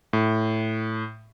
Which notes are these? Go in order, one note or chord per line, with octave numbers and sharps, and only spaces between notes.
A2